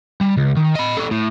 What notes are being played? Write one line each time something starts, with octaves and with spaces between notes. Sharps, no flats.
G3
C#2
D#3
D#5 B5
C#4 A4
A2